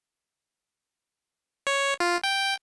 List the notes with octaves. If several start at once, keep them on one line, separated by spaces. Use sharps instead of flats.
C#5
F4
G5